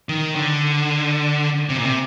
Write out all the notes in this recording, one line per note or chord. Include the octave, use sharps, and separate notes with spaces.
D#3
D3
C3
A#2
C3